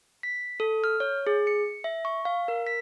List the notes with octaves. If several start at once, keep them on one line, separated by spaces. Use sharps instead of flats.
B6
A4
F6
C#5
G#4
C#7
E5
C#6
F5
A#4
B6